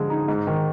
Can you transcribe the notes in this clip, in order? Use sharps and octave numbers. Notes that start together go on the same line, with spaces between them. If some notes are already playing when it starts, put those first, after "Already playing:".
Already playing: D3 F3 G#3
D#4
G#2
D#3